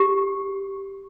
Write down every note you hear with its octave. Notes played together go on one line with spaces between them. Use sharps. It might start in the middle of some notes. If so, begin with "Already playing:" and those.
Already playing: G4